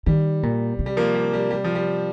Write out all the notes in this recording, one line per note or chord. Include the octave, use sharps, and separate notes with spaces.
D#3 G3
A#2
C3
G3
F3 A#3
G3
G3
G3
F3
G3